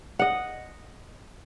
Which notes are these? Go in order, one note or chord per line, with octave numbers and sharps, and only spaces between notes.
D#5 F#5